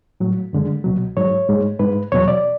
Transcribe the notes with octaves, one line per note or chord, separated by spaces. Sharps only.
A2 F#3
F#2 D3 G#3
C#2 B2 F#3
G#2 F#3 C#5
G#2 G#3
G#2 G#3 B4
E2 B2 F#3 C#5
D5